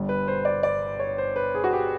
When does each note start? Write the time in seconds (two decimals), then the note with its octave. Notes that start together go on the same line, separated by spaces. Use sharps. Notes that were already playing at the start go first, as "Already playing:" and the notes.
Already playing: G1 G2 D3
0.09 B4
0.28 C5
0.45 D5
0.63 D5
1.00 C#5
1.18 C5
1.36 B4
1.55 G#4
1.64 F#4
1.73 G4